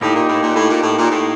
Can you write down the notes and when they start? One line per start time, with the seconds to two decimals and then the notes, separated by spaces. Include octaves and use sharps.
0.01 A2 A#3 D#4 G4
0.14 A#2
0.28 A2
0.42 A#2
0.55 A2
0.70 A#2
0.82 A2
0.97 A#2
1.10 A2